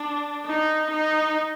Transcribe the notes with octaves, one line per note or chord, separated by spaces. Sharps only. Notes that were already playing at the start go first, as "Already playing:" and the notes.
Already playing: D4
D#4
D#4